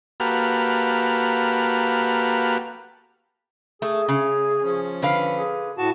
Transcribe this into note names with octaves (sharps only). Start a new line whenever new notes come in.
A#3 F#4 G4 A4 B4 F5
A3 G#4
C#3
F3 C#4
D3 B4 F5
G#4
A2 F#4 A5